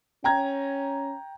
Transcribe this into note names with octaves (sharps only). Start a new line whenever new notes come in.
C#4 G5 A#5 G#6